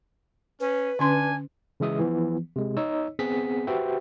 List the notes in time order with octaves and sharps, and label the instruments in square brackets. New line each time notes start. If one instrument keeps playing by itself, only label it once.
[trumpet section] C#4 [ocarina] B4
[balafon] D3 C#4 C6 [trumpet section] D4 G#5
[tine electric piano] C#3 E3 G#3 E5 D#6
E3 F3 B3
C3 G#3
D#4 C#5 D#5 E6
B3 C4 G#4 F#5 B6
F#4 G4 B4 C5 E5 G5